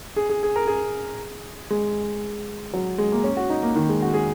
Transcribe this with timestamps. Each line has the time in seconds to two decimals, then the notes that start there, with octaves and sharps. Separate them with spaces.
0.16 G#4
0.29 G#4
0.43 G#4
0.56 A#4
0.67 G#4
1.70 G#3
2.73 F#3
2.98 G#3
3.12 A#3
3.24 C#4
3.37 F#4
3.50 D#4
3.63 A#3
3.76 D#3
3.89 G#3
4.02 F#4
4.14 G#4